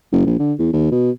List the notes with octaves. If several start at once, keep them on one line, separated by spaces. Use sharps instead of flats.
F#1
A#1
D3
E2
D#2
B2